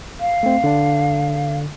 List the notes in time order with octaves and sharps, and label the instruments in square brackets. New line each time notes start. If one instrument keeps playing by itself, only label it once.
[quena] F5
[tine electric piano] A3 C4
D3 D4